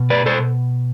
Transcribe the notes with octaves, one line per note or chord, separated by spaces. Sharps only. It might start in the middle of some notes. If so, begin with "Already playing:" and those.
Already playing: B2
B4 D5
A4 C5